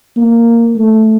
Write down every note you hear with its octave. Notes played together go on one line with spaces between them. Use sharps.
A#3
A3